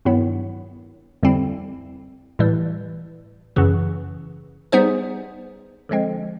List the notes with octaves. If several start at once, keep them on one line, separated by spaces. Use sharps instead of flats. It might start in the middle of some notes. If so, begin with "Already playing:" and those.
G2 D#3 F#3 B3 E4
F2 D3 G3 C4 E4
A2 E3 G3
F#2 C#3 E3
G3 B3 D#4 G#4 C5
D3 F3 G#3 C4